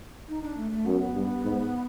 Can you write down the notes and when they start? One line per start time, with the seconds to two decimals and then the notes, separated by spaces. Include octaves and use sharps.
0.28 D#4
0.43 D4
0.57 A3
0.71 A3
0.86 F#2 B3
1.14 G2
1.44 G#2